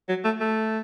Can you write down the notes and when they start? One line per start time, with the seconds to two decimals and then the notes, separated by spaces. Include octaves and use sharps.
0.09 F#3
0.25 A3
0.41 A3